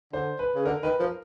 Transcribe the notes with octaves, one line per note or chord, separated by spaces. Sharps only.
D3 C5
B4
C#3
D3 A#4
D#3 B4
F3 A#4